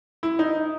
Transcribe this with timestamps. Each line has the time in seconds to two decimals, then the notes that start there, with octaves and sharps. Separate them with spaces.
0.23 E4
0.39 D#4